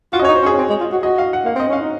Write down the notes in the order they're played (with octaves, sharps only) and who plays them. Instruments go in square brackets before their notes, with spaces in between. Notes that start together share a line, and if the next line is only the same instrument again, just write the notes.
[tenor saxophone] F4 [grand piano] F#4
[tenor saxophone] C#4 [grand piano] D#5
[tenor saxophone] D#4 [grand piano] C#5
[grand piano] C5
[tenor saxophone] C#4
[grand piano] G#4
[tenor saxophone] C#4
C4
G#3
F4
F#4
[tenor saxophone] F#4 [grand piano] D#5
[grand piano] F5
F#5
[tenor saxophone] A#3 [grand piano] F5
[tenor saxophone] C4 [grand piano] D#5
[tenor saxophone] C#4 [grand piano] F5
[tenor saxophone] D#4